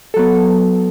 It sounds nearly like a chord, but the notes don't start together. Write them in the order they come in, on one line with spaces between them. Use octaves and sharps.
A4 F#3 B3